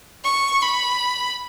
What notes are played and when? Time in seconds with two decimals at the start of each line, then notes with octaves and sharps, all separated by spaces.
0.24 C#6
0.62 B5